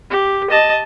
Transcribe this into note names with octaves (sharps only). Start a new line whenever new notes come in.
G4
D#5 A5